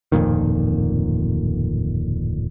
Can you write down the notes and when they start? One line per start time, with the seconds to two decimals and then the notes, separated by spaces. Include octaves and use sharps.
0.12 D1 F2 A#2 D#3